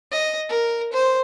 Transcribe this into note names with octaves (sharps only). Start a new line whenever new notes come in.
D#5
A#4
C5